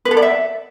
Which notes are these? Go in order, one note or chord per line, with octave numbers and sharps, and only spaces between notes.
B4
A4
D5
E5